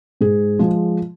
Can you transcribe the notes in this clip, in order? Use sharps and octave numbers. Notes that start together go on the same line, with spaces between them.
G#2 G#4
F3 G#3